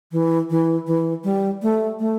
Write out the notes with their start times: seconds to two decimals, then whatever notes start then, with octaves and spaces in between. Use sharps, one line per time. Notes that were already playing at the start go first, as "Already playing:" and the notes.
0.12 E3
0.50 E3
0.87 E3
1.24 G3
1.62 A3
2.00 A3